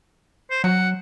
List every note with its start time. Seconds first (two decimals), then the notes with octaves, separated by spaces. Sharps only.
0.51 C5
0.64 F#3 F#5